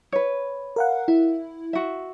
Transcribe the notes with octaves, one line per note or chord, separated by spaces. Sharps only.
B4 C#5
A#4 F5 F#5
E4 E5
F#4 E5